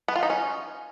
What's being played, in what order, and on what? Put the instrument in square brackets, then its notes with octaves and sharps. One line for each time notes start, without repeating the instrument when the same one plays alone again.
[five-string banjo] B3
F4
D#4
C#4